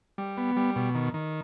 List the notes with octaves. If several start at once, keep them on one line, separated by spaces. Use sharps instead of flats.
G3
B3
G3
B2
D#3
D#3